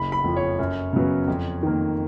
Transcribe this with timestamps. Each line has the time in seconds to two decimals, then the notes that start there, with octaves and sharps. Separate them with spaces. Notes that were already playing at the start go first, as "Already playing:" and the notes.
Already playing: F#1 B5
0.12 B5
0.24 F2 F3
0.36 C#5
0.59 F#2
0.93 C#3 F#3 B3
1.27 F2
1.63 D#3 A#3